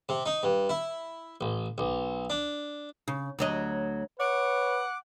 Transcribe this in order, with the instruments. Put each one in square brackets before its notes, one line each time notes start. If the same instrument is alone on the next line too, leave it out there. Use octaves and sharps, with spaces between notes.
[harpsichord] C3
D#4
G2
E4
A1
B1
D4
[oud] C#3
D2 F#3 D#5
[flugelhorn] B4 [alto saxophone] C#5 [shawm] F#5 [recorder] D6